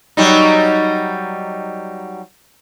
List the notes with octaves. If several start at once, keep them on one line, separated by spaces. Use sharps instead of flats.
F#3 G3 D#4